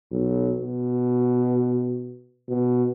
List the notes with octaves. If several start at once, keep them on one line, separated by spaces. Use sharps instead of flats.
B1
B2
B2